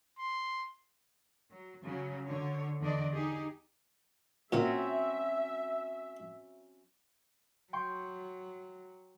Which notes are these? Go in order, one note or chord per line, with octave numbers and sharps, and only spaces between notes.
C6
F#3
C#3 F#3
D3 C#5
E2 D3 D4 D5 D#5
D#4 G4 G#4
A#2 F#3 C4 C#4 E5
F#3 G5 C6 C#6